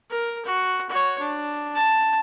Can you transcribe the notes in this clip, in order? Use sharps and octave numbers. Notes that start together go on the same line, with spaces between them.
A#4
F#4
F#4 C#5
D4
A5